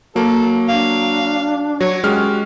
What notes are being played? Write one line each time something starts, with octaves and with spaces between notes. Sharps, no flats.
F#3 A#3 A4
D4 F5
F#3 C#5
F#2 G#3 F#4 G4 F6